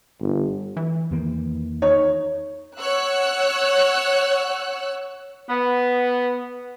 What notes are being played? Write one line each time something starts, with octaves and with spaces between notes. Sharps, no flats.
G1
E3
E2 D#3 A#3
D#4 C#5
C#5 F#5 E6 F#6
B3